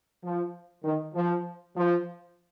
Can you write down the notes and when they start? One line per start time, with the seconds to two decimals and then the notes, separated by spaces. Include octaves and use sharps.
0.23 F3
0.84 D#3
1.15 F3
1.76 F3